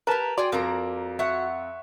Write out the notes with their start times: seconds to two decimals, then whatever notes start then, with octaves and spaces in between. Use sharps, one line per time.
0.07 G4 A#4 B4 A5 A#5
0.38 F#4 G#4 D5 G5 C6
0.52 F2 A#3 D5 A#5
1.19 C#5 E5 F#5